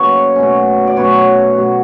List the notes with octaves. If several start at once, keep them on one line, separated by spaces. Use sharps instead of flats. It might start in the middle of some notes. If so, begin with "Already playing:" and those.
Already playing: C#3 F#3 A#3 B4 C#5
B2 F#3 A3 C#4
D5
B2 F#3 A3 C#4 B4 C#5
B2 F#3 A3